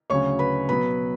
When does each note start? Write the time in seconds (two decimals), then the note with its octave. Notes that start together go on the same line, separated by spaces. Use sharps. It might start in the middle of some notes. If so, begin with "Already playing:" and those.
0.10 D2 C#3 F#3 C#4 C#5 C#6
0.39 B4 B5
0.69 B2 F#3 B3 B4 B5